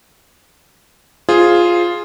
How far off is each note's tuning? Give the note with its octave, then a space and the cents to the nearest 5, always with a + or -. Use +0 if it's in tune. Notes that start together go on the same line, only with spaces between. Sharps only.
F4 +0 G#4 +0 C5 +0